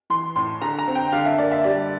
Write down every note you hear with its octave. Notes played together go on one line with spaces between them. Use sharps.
E3 C6
A2 C6
D3 A#5
A#5
C4
G5
D3 F5
E5
A#3 D5
E5
G3 D5